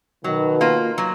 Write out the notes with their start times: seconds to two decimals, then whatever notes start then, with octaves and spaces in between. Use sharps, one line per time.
0.24 B2 D#3 F#3
0.61 A#3 F4
0.98 F#3